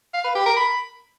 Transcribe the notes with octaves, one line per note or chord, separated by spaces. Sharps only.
F5
B4
G4
A#4
B5